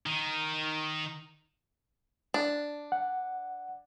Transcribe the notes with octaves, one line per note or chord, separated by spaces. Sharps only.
D#3
D4
F#5